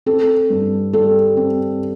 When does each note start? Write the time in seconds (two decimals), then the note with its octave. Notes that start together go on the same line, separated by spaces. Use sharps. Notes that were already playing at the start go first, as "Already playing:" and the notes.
0.06 C4 A4
0.50 G2
0.93 G3 A4
1.37 C4